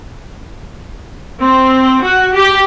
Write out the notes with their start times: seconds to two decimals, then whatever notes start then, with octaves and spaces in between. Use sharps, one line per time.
1.41 C4
2.03 F#4
2.34 G4